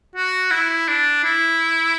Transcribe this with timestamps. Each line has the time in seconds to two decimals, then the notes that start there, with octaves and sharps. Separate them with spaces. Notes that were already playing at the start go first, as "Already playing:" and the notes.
0.15 F#4
0.51 E4
0.88 D4
1.24 E4